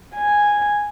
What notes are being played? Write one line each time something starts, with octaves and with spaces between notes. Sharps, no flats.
G#5